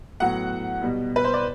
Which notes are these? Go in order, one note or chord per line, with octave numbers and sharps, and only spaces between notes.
A2 F#3 B3 F#5
B2 G3 B3
B4
C5
D5